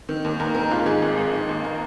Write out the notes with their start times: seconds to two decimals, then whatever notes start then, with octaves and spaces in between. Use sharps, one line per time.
0.09 D#3
0.25 D#2
0.40 D#2 A#4
0.55 D#3 A#4
0.71 G#2 F4
0.86 D#3 G#4
1.02 G#1
1.17 G#1
1.33 D#3
1.49 D#2
1.64 A#4